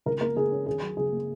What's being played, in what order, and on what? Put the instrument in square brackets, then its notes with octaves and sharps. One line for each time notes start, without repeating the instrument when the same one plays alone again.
[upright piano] C#2 [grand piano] A#4
[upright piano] A#3 [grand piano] A#4
[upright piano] C#3 [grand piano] G#4
[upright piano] C#4
[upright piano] D#2 [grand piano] G#4
[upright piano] F#3
[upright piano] C#3 [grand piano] G#4
[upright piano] A#3